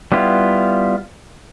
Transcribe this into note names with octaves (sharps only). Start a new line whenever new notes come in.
G3 B3 E4 F4